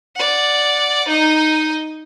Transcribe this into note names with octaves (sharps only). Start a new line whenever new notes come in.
D5 F#5
D#4 D#5